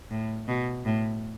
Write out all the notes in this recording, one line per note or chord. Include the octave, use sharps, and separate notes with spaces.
A2
B2
A2